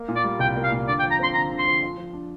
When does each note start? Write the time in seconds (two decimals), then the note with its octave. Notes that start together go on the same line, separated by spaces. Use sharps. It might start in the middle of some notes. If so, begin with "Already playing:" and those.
Already playing: A#3
0.08 A#2
0.16 D5
0.24 G3
0.39 C2 G5
0.56 A#3
0.64 F5
0.72 A#2
0.87 D3 D5
0.99 G5
1.04 F3
1.11 A#5
1.19 C4 C6
1.34 D3 A#5
1.50 D3
1.59 C6
1.67 F3
1.82 F4
1.97 F3
2.13 D4